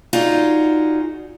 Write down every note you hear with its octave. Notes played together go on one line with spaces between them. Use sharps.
D#4 F4 F#4 G#4 D5